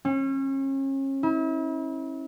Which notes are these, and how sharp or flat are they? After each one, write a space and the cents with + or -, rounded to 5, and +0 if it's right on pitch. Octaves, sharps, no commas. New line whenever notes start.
C#4 -35
E4 -40